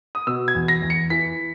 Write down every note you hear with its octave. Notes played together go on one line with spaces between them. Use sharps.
D#6
B2 E6
G#6
E2
A#6
E2
C#7
E3 B6